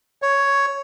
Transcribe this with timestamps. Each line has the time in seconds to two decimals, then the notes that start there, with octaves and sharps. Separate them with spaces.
0.22 C#5